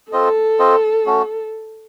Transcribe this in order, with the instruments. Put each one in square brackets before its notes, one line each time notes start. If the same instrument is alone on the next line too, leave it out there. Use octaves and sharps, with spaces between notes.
[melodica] C4 F4 C5 D#5 [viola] A4
[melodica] C4 F4 C5 D#5
A3 C#4 F#4